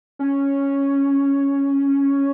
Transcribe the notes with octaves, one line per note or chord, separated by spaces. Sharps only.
C#4